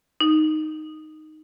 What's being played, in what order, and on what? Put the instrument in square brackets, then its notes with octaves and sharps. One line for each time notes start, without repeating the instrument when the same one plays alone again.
[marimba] D#4